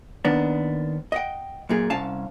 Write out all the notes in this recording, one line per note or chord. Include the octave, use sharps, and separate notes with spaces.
D#2 D#3 B3 D4
D#5 F#5 G5
F#2 A#2 G#4
C2 C#4 F5 A5